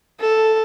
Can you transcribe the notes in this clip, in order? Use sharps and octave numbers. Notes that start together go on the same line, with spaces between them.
A4